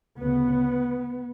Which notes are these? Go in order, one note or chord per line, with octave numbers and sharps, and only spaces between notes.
D2 C#3 B3